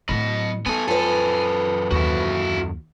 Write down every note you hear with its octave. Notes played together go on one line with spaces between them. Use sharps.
A2 F#3 D#5 B5
B3 D#4 A4 G#5
F#2 F3 A4 B4
D#2 E4 F#4